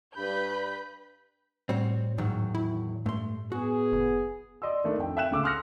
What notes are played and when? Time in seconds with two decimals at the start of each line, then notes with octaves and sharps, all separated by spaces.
0.17 G2 B4 B5 G6
1.69 A2 G3 C4 F#4 C#5
2.18 E2 G#2 D#3 F#3
2.55 E4
3.06 G2 A3 C6
3.52 B3 F#4 G#4
3.92 F#1
4.62 D5 D#5 C6 E6
4.84 D#3 A3 D4
4.98 F2 G5
5.17 E5 G5 F#6 E7
5.31 D2 C#3 D6 E6
5.44 C6 D#6 F6 F#6 A#6 C#7